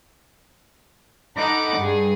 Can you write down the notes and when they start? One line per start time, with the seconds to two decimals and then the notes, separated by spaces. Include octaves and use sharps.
1.37 D#4 A4 F#5 B5 D6
1.80 G2 G#4